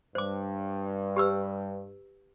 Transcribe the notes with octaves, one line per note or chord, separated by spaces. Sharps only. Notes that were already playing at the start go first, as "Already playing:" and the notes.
G2 C5 D6
G4 B4 E6